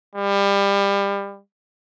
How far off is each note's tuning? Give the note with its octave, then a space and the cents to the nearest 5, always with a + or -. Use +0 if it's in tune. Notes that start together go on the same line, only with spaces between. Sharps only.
G3 +25